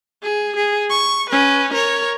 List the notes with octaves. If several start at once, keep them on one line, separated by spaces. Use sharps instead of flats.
G#4
G#4
C#6
C#4 B4
A#4 C#5